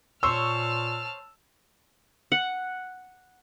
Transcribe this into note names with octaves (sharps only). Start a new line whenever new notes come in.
A#2 C5 C#5 A5 E6 F6
F#5